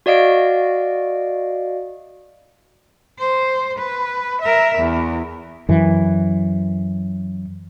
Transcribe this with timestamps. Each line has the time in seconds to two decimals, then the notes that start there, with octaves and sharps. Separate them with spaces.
0.06 F#4 D5 D#5 F5 D7
3.19 C5
3.79 B4
4.42 A#4 E5
4.79 E2
5.69 F#2 E3